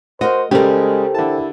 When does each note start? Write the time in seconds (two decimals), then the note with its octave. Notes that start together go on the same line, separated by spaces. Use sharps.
0.21 F#4 A#4 C5 D#5
0.51 C#3 G3 G#3 G4 A4 A#4 C5 G5
1.15 D3 E4 A5